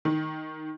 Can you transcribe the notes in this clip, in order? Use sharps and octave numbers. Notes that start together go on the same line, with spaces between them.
D#3